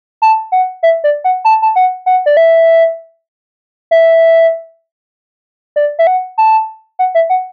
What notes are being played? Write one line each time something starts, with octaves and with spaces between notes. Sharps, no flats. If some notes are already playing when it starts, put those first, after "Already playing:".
A5
F#5
E5
D5
F#5
A5
A5
F#5
F#5
D5
E5
E5
D5
E5
F#5
A5
F#5
E5
F#5